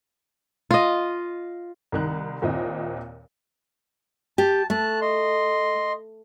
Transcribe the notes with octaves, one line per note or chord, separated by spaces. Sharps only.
F4 D#5
C2 D#3 F#6
D#2 A#2 C4 E4 D#5
G4 A5
A3 A5 F#6
D#5 C6